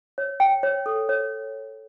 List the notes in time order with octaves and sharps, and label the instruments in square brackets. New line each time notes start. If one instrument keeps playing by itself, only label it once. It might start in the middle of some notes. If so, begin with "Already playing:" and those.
[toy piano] C#5
G5
C#5
A4
C#5